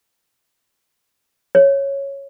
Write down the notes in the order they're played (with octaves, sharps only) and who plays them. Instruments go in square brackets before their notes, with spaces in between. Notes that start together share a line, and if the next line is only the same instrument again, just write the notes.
[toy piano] C#5